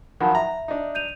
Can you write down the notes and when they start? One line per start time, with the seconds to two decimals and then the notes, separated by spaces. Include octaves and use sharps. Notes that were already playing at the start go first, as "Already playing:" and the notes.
0.21 D#3 F3 F#3 F#5 B5
0.35 E5 A#5
0.68 D4 D#4
0.95 G6 D#7 F7